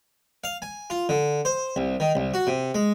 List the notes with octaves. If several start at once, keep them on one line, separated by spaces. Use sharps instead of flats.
F5
G#5
F4
D3
C5
C2
D#3
C2
F#4
C3
G#3